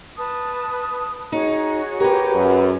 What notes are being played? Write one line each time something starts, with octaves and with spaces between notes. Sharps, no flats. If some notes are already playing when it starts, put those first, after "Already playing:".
B4 A5 D#6
D#4 F#4 G#4 C#5
G4 A#4 B4
F#2